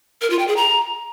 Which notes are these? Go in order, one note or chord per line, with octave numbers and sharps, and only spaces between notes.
A#4
F4
G5
G#4
A#5